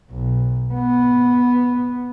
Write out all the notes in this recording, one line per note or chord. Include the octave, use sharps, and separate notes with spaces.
B1
B3